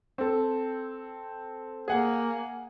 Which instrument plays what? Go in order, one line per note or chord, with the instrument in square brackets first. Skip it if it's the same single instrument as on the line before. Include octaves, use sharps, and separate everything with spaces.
[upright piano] C4 A4
[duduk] A#3 [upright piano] G#4 F#5 G#5